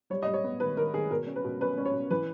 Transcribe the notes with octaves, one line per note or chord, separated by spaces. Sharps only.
G3 C#5
G3 D#5
C#5
B3
D#3 B4
D#3 A#4
D#3 G#4
B2 A#4
C#4
B4
B2
C#4 B4
C#4
C#5
B2
E3 B4